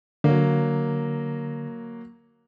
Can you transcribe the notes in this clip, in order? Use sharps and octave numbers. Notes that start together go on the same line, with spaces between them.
D3 F#3 A#3